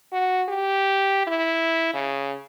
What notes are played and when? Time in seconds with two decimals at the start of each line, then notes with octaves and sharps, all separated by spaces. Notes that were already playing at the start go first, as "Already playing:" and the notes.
0.13 F#4
0.49 G4
1.27 E4
1.94 C#3